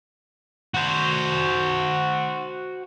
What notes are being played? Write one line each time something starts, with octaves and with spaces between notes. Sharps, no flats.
F#4 C5